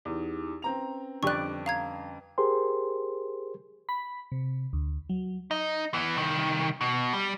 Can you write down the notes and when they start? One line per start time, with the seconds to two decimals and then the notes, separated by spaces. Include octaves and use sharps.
0.05 E2 D#4 E4 G4
0.62 C4 C#4 B4 A#5 F7
1.23 F2 D3 G3 D4 G4 D5 C#6 F#6
1.66 F5 A#5 G#6
2.38 G4 G#4 A#4 C5 C6
3.89 B5
4.32 C3
4.73 D2
5.09 F#3
5.51 D#4
5.94 E3 B3
6.17 C2 D#3
6.81 B2
7.13 G3